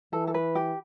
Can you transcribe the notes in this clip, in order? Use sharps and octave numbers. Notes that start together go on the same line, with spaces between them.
E3 A4
A4
B4
G4